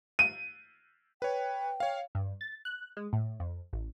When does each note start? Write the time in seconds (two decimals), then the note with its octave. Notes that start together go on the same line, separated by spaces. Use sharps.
0.19 D#7
1.22 B4 C#5 G5
1.80 C#5 F5
2.15 G2
2.41 A6
2.65 F#6
2.97 G#3
3.13 A2
3.40 F2
3.73 A1